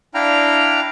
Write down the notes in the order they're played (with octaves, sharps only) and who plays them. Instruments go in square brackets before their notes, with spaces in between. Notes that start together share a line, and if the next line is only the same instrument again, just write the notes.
[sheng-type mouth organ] D4 E4 F5 G5 A#5 F6